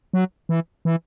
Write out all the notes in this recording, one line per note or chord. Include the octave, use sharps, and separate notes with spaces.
F#3
E3
E3